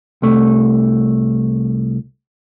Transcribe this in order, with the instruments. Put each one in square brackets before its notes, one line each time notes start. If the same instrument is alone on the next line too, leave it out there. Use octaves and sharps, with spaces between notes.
[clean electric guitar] C2 A3